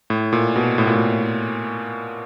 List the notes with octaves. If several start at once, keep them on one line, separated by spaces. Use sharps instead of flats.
A2
A#2
B2
A2
A#2
A2